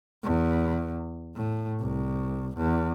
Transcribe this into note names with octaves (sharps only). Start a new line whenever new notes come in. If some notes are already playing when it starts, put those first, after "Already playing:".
E2
A2
C2
E2